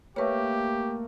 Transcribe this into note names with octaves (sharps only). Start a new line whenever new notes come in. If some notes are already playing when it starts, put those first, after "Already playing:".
A3 A#3 G4 B4 C#5